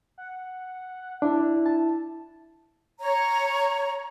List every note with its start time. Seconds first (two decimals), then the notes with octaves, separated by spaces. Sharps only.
0.18 F#5
1.22 D4 E4
1.66 A5
3.00 C#5 A#5